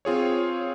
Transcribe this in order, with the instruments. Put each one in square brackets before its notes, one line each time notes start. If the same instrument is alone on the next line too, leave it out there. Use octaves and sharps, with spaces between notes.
[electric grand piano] C4 F4 G#4 C#5